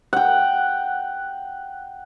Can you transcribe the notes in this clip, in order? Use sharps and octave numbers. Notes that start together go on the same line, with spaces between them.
F#5 G5